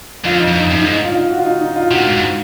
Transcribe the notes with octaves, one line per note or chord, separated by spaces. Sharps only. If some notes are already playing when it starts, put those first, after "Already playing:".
F2 F4
D#4
F2
D#4
F#2 D#4
D#4
G#2
D#4
F4
F4
F#4
F4
D#4
D#4
F4
C3 F#4
A#2
G#2
G#2